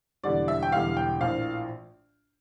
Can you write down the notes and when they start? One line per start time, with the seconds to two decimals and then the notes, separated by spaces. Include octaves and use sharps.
0.23 E1 E2 D3 G3 D5
0.48 E5
0.63 G5
0.72 E1 E2 D3 G3 F5
0.97 G5
1.21 A#1 A2 F3 F5